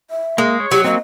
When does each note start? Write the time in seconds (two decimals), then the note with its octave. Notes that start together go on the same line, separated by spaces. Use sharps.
0.10 E5
0.38 G#3 A#3
0.60 C#5
0.71 F#3 G4
0.84 A#3 C4 D#5